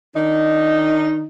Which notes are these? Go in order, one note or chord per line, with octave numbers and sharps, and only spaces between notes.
D#3 D4 D#4